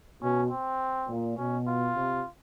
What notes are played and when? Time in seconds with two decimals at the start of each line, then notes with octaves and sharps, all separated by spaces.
0.22 B2 C#4
0.50 C4
1.09 A#2
1.37 B2 C#4
1.67 F4
1.96 C3